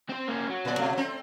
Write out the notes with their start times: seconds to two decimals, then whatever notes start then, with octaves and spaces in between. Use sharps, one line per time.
0.09 C4 C5
0.28 A#3 C#4
0.49 F#3
0.65 A#2 D5
0.78 B2 A3
0.95 A3 C4